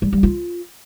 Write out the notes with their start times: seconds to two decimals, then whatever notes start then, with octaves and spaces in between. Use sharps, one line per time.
0.02 G3
0.13 G3
0.23 F4